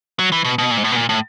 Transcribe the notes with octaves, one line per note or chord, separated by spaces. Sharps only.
F#3
E3
B2
B2
A#2
G#2
A2
B2
A#2
A2